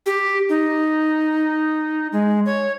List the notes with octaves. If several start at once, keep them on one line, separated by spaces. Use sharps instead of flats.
G4
D#4
G#3
C#5